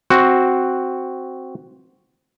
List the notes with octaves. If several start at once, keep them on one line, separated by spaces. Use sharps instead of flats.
C4 F#4